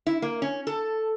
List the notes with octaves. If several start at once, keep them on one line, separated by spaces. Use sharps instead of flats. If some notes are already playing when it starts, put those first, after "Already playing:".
E4
A#3
C#4
A4